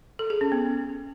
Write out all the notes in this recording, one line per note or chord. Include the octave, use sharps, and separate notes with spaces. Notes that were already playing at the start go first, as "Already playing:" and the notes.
A4
G#4
C#4
B3